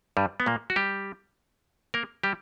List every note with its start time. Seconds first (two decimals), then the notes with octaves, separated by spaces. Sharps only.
0.17 G2 G3
0.40 B3
0.46 A#2 A#3
0.70 F#4
0.76 G3 G4
1.94 A#3 A#4
2.23 G3 G4